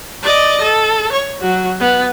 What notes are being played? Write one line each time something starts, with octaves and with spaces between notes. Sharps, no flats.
D5 D#5
A4
C#5
F#3 F#4
B3